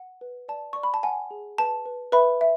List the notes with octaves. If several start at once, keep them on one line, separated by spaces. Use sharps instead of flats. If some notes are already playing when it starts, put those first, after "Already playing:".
Already playing: F#5
B4
D5 A5
D5 C#6
B5
A5
F#5 G#5
G#4
B4 A5
B4
B4 E5 B5
E5